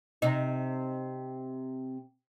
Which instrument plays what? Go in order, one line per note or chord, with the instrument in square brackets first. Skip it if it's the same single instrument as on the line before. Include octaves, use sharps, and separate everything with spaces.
[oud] C3 D#4